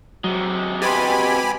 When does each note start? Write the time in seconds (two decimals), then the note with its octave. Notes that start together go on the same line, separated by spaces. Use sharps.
0.24 C3 F#3 G#3
0.82 B2 G4 G#5 B5 C6 G#6 A6